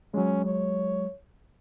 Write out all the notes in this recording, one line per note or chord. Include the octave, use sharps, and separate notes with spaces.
F#3 G#3 C#4
C#5